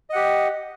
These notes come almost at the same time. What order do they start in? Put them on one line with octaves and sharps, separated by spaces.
D#5 F#5 G4